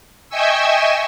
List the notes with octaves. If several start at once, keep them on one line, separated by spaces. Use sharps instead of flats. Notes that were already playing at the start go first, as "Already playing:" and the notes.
D#5 E5 G5 G#5 C#6 E6